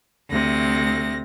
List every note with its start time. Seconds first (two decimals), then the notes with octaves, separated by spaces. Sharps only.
0.29 D2 C3 A#6